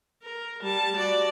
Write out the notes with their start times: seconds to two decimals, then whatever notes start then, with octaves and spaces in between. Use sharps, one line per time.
0.23 A#4
0.62 G3 A5
0.96 F#4 D5